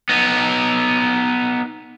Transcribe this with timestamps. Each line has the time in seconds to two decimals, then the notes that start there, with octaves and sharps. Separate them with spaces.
0.09 B3 D#4